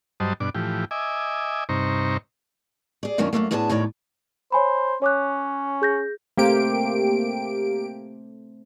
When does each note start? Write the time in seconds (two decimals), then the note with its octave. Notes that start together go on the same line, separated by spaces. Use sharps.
0.20 G2 F#3 G3 C5 D#5 A5
0.40 G2 B2 D4 D6
0.55 A2 E3 F3 G4
0.91 D#5 E5 G#5 D6
1.69 G2 C3 D#4 C5 A#5 C#6
3.03 G#4 D5
3.18 F#2 A#2 D#3 A#3 C#4 D4
3.33 F#2 B2 A3 A#3
3.51 A2 B3 D4 G#4 D5 A5
3.69 D#2 A2 D#3 C#5 D5
4.52 C5 C#5 G#5 B5
5.02 C#4 C#5 D6 F#6
5.82 G#4 G6 A#6
6.38 A3 A#3 C4 G4 C5 D7